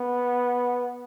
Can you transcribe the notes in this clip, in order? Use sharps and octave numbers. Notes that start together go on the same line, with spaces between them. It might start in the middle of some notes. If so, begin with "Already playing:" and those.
Already playing: B3